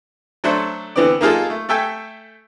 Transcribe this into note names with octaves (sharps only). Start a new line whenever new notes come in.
F#3 A3 D4 A4 C5
D3 E3 B3 C4 D5
A#3 D#4 F4 G#4 A4
A3
A3 A4 E5 G5 G#5